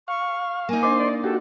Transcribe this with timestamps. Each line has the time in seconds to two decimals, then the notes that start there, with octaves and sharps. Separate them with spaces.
0.08 F5 C#6
0.69 A#3 D#4 G#5
0.83 D4 C5 D#5 C6 D6
0.98 D5
1.24 F#4 G4 A4